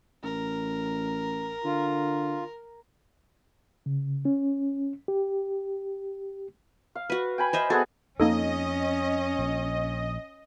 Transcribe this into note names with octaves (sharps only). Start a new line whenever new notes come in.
A1 A#4
D3 F4
C#3
C#4
G4
F5
F#4 B4
G5 G#5 B5
C5 D#5 E5
B3 F#4 G#4 A4
F2 A#3 C#4 D#4 A4 D#5
A#1